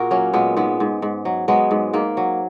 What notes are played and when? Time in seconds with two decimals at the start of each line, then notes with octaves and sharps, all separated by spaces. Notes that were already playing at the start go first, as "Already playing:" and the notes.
Already playing: A#2 F#4 G#4 A#4
0.11 F#3 A#3 C#4
0.33 A#2 G#3 B3
0.56 G#2 G#3 B3
0.80 G#2
1.02 G#2
1.25 F#3
1.48 F#3 G#3 B3
1.71 G#2
1.93 G#2 A#3
2.17 F#3